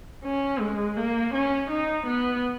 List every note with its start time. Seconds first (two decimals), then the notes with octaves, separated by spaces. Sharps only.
0.24 C#4
0.60 G#3
0.97 A#3
1.34 C#4
1.70 D#4
2.06 B3